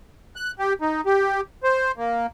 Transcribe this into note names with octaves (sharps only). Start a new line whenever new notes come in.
F#6
G4
D#4
G4
C5
A#3